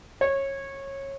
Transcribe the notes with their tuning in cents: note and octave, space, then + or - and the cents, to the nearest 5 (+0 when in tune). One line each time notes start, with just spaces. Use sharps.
C#5 -20